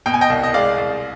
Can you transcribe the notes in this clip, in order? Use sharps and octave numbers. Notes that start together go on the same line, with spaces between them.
B2 G5
G#5
D#5 G5
C2
D#5
G#3 D5 F5
C2